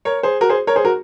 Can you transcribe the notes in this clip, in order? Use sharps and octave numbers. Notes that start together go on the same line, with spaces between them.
A#4 C#5
G#4 C5
F#4 A#4
G#4 C5
A#4 C#5
G#4 C5
F#4 A#4